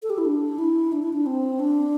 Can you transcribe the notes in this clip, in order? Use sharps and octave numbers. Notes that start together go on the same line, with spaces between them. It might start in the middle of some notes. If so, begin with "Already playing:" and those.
A4
G4
E4
D4
E4
D4
E4
D4
C4
D4